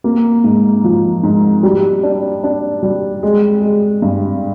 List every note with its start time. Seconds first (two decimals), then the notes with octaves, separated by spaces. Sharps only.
0.04 A#3
0.44 G#2
0.84 F3
1.23 G#2
1.63 G3
2.03 D4
2.44 D4
2.83 G3
3.23 G#3
3.62 G#3
4.02 G2